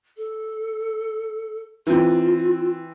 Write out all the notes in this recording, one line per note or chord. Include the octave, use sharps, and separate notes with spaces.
A4
E3 C4 F4